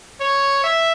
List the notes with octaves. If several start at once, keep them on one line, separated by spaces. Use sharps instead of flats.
C#5
E5